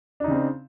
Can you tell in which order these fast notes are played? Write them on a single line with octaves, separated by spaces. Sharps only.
D4 D#4 C#3 C4